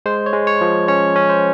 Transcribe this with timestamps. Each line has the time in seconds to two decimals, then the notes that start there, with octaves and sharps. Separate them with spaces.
0.06 G#3 C5
0.26 C#5
0.33 G#3
0.47 C#5
0.61 F3
0.88 C#4 C#5
1.16 C#4
1.29 C5